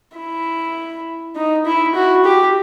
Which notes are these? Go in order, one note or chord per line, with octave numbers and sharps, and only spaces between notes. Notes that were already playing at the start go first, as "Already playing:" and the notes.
E4
D#4
E4
F#4
G4